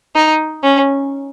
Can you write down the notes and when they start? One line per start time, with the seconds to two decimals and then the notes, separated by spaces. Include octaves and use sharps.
0.15 D#4
0.63 C#4